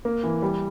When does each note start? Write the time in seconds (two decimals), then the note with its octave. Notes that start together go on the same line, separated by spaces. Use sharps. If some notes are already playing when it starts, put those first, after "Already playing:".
0.05 A#3
0.23 E3
0.42 G3